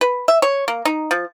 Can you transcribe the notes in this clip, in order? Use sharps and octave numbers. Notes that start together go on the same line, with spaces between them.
B4
E5
C#5
A#3
D#4
F3